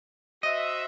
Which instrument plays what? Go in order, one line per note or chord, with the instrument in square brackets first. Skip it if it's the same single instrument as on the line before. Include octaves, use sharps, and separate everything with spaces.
[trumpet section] F#4 C5 E5 [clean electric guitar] D#5